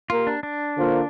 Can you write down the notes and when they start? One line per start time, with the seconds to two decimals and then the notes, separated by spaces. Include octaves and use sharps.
0.10 A#3 F4 G4 A#4
0.27 D4
0.43 D4
0.77 D3 A#3 F4 C5